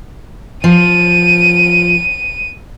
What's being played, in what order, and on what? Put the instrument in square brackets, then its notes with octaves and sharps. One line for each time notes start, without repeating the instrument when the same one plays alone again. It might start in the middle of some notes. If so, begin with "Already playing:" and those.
[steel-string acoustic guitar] F3 [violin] D#7